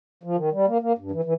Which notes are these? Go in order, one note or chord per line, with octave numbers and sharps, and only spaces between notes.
F3
D#3
G3
A#3
A#3
G2
E3
E3